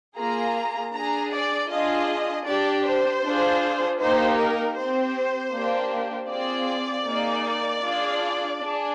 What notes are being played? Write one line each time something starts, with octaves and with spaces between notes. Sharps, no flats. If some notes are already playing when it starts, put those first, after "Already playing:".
A#3 F4 G#4 A#5
D4 G#4 A#5
D5
D4 F4 G#4 D#5
D4 G4 D5
C5
D4 F4 G#4
A#3 D#4 G4 C5
A#4
C4 G4 C5
A#3 D4 G4
C4 F4 G#4 D5
A#3 D#4 G#4
D4 F4 G#4
D4 G#4